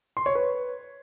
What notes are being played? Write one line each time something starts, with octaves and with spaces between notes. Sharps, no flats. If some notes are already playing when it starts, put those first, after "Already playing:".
C6
C#5
B4